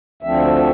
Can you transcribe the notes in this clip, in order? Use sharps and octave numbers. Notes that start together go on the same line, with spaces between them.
D2 D3 F3 A3 C4 E5